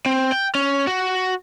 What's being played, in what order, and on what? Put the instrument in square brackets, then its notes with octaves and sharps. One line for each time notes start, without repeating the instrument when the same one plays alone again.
[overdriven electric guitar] C4
G5
C#4
F#4